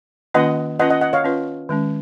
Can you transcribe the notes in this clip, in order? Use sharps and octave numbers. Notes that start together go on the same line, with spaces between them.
D#3 A#3 C#4 F4 B4 D#5 F#5
C#4 F4 B4 D#5 F#5
D#5 F#5
D#5 F#5
C#5 F5
C#4 F4 B4
D#3 G#3 C#4